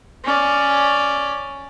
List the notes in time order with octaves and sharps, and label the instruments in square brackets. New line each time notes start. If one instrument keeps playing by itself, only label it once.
[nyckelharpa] C#4 D5